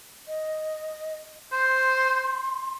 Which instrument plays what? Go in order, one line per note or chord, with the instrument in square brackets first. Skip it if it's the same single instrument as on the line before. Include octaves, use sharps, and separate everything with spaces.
[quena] D#5
[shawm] C5 [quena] C6